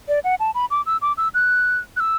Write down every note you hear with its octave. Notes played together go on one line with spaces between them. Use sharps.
D5
F#5
A5
B5
D6
E6
D6
E6
F#6
F#6
E6